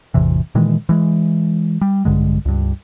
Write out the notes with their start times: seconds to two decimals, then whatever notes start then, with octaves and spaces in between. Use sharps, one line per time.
0.14 A1 E2 C3 E3
0.55 A#2 D#3 E3 G#3
0.89 E3 G#3
1.81 G3
2.05 A#1 G2 D3 G#3
2.45 C#2 G2